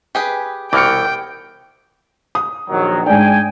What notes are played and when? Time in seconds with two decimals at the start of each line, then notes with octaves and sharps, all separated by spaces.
0.15 G4 G#4 B4
0.73 C2 B2 E3 G5 D6 F6 C#7
2.35 D#6
2.69 A#1 D#3 F#3
3.06 G#2 D4 D5 G5 G#5